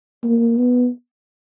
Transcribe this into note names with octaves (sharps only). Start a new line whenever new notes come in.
A#3
B3